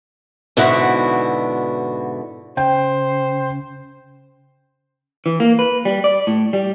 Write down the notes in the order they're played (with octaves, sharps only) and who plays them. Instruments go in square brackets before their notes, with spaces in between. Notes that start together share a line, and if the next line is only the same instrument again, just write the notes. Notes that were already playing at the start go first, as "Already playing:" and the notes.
[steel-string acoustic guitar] G#2 B2 D3 E4 F#4
[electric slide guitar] C#3 [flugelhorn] C5 [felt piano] G5
[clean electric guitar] E3
A#3
B4
G3
D5
A2
G3